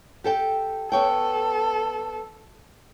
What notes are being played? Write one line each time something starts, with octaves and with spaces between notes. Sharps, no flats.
G4 A4 G5
B3 A4 C#5 G5